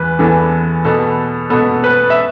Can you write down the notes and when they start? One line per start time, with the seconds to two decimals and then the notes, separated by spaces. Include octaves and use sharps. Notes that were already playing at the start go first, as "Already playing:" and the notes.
Already playing: E2 E3 B4
0.19 E2 E3 B3 A4
0.84 B2 B3 A4
1.50 B2 B3 A4
1.84 B4
2.10 E5